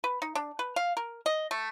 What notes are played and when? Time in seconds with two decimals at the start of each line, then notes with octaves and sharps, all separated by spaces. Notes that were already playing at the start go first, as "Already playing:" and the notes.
0.04 B4
0.22 D#4
0.35 D4
0.59 B4
0.76 F5
0.97 A#4
1.26 D#5
1.51 A3